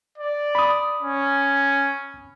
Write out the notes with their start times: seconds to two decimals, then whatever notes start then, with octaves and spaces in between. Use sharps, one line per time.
0.18 D5
0.55 B5 D#6
1.01 C#4